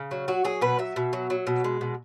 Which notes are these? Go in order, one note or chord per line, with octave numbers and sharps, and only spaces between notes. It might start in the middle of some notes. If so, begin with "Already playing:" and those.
Already playing: C#3
F#3
F#3 F#4
F#3 G#4
B2 B4
F#3 E5
B2
F#3
F#3
B2
G#3
B2